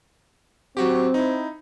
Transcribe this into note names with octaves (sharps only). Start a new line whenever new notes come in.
F#3 C4 F#4 G4
D#4 E4